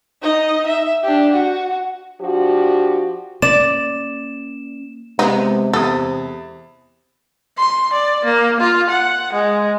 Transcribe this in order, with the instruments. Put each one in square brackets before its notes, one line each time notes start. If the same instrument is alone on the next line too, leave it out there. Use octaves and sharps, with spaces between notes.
[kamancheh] D#4 D#5
E5
D4 G4
F#4
[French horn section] F3 D4 F#4 G4
[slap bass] A#3 C#4 [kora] D5 [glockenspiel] E7
[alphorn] C3 [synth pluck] G#3 B3 [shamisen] D#4
[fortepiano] E2 D#6 [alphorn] C3 [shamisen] A4
[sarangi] C6
D5
A#3
F4
F#5
G#3